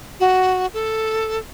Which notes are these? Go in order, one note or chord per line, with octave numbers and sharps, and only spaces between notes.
F#4
A4